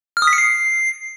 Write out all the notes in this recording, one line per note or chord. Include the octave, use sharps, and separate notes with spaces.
F6
D#6
B6
C#7
C7